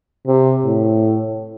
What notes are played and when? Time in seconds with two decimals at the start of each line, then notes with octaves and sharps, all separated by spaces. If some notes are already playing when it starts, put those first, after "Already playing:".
0.27 C3
0.65 A2